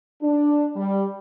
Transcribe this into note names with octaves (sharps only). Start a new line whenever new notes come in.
D4
G3